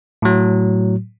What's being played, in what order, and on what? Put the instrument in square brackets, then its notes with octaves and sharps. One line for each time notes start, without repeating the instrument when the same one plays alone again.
[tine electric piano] A2 F#3